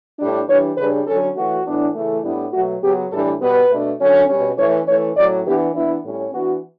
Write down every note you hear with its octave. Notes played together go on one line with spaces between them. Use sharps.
A2 G3 D4
E3 G3 D4 C#5
C#3 G3 D4 B4
D3 F#3 C#4 A4
E3 A3 C#4 F#4
A2 E3 B3 D4
C#3 E3 A3
A2 G3 B3 D4 E4
B2 F#3 A3 F#4
C#3 F#3 B3 G4
A2 E3 G3 D4 A4
B2 G3 B3 B4
B2 A3 D4
D3 F#3 C#4
B2 G3 C#4
E3 A3 C#4 C#5
E3 A3 C#4 C#5
A2 F#3 C#4 D5
E3 B3 D4 G4
E3 B3 D4 E4
A2 G3 C#4
E3 B3 D4 F#4